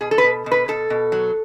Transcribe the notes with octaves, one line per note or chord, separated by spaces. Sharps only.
B2 G#4
A4
B4
B2
B2
B4
B2 A4
B2
F#3